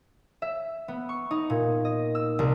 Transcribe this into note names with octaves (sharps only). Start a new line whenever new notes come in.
E5
B3
C#6
D#4
A#2
D#5
E6
C2